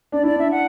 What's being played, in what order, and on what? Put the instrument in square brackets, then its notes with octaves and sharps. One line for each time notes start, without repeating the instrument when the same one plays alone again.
[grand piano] D4 [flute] D5
[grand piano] E4 [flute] D5
[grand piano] D4 [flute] E5
[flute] F#5